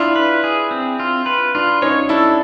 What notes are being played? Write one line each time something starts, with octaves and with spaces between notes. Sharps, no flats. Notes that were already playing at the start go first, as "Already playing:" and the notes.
Already playing: D4 E4 F4
B4
G#4
C4
F4
B4
D4 F4
C#4 D#4 C#5
D4 E4 A4